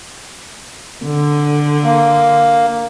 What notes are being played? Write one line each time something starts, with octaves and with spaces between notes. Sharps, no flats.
D3
A#3